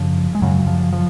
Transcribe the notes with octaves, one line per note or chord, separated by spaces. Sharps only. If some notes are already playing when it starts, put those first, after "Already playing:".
Already playing: F#2 C#3 F3
G#3
F#2 C#3 F#3
F3
F3